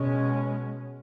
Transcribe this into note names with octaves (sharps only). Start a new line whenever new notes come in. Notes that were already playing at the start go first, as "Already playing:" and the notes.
Already playing: B2 G#3 C#4